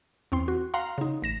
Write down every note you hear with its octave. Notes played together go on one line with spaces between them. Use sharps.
E2 C4 C6
F#4
F5 F#5 A#5 C6
C#3 D#4
A1 A#6 E7